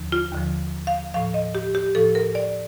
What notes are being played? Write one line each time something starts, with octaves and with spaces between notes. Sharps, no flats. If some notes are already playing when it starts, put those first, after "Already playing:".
Already playing: D#2 D3 F3
F4
D#2 D3 F3
F5
A2 F3 F5
D#5
G4
G4
A2 F3 A4
A#4
D5